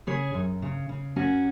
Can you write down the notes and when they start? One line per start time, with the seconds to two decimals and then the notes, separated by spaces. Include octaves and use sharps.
0.07 C#3 G#4 C#5
0.34 F#2
0.62 C#3
0.89 C#3
1.16 F#2 C#4 F#4